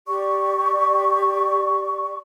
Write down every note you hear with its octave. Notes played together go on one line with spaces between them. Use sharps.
G4 D5 C#6